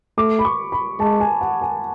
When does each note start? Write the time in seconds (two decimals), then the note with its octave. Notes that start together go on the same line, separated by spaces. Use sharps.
0.18 A3 D6
0.39 B5
0.45 C#6
0.72 B5
0.99 G#3 A5
1.20 G#5
1.41 F#5
1.62 G#5